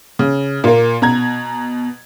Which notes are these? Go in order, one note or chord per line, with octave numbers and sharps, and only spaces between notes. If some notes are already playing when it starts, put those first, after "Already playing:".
C#3
A#2 A#3
B2 A#5 G#6